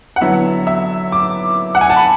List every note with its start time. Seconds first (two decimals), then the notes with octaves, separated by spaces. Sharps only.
0.16 F#5
0.21 D3 F#3 B3 E4 E5
0.67 E5
1.12 D6
1.75 F#5
1.81 G#5
1.90 A5
1.96 B5